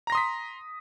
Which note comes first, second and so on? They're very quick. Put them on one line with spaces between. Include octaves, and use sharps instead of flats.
A#5 A#6 C6 D#6 B6